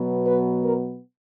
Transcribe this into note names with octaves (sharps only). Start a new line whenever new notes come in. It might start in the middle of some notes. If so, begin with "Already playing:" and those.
Already playing: B2 F#3 B3
B4
A#4